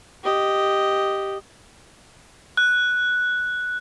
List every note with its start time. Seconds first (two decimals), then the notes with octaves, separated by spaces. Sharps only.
0.23 G4 D#5
2.57 F#6